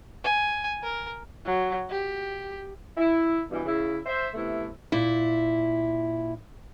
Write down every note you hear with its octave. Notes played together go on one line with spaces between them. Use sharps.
G#5
A#4
F#3
G4
E4
G2 B2 E3
C#3 E4
C5 E5
C3 A3 B3 E4
A#2 E4